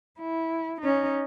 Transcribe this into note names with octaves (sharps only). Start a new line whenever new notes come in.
E4
C#4 D#4